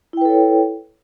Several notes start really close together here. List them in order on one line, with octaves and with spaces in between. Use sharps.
E4 G5 B4 A4 C#5